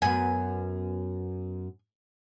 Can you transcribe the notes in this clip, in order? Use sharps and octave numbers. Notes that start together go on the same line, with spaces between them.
F#2 B3 G#5